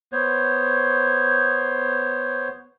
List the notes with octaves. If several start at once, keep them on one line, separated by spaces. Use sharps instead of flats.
B3 C5 C#5